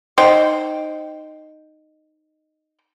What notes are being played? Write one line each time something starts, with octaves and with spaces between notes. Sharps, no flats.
D#4 C5 G5